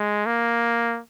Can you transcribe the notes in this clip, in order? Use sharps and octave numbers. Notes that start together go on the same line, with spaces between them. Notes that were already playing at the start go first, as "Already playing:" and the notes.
Already playing: G#3
A#3